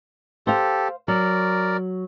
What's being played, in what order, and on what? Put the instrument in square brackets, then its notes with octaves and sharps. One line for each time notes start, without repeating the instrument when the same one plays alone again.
[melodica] G4 A4 [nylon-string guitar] C5 F5
[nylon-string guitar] F#3 [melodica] A#4 D5